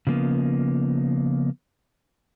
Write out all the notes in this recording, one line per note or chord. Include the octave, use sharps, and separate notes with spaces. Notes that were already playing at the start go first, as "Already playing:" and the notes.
C#3 F3 A#3 B3